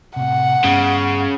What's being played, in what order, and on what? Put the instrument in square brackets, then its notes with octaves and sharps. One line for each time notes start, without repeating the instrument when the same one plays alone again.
[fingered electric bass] A2 C3 [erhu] F#5
[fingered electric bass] G2 B3 [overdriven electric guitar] C#3